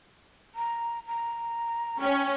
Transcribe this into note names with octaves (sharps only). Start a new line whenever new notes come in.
A#5
A#5
C#4 G5